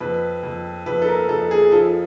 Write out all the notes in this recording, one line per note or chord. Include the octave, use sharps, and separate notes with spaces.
F2 B4
F2
F2 B4
A4
A#4
F2 A4
G#4
F3 A4